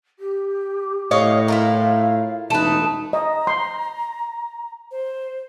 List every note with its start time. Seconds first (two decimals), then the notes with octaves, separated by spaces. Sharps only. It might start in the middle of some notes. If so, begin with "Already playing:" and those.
0.19 G4
1.11 A2 C#5 D#5 F5
1.48 E4 F4 A#4 F5
2.50 E1 A3 D#4 B4 A5
3.13 D#5 A#5
3.47 C6
4.91 C5